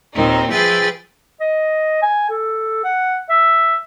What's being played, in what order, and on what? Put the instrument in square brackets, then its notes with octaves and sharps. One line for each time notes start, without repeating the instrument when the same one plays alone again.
[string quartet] D#2 A#2 D#3 C4 D#4
F3 G#4 B4 E5 G5 A6
[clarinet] D#5
G#5
A4
F#5
E5